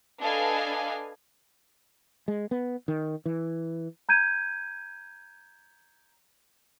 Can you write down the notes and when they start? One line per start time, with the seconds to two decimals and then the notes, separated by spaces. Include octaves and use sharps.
0.21 D4 A4 B4 D#5 F5 G#5
2.28 G#3
2.51 B3
2.88 D#3
3.26 E3
4.09 A#5 G6 G#6 D#7